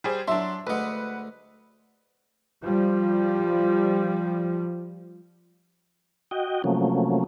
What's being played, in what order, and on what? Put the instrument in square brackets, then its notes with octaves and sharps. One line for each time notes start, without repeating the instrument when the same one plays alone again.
[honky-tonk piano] G3 G#4 C5
[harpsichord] F#3 [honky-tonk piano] D4 C6 [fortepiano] E5
[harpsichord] D2 G#3 [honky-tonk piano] B4 F#5
[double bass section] F3 G3
[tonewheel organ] F#4 D#5 G5
C3 F3 F#3 A3 A#3 C#4